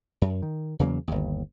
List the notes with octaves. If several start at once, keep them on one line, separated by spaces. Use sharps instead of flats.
F#2
D#3
E2 C#3 F#3 A#3
G1 D#2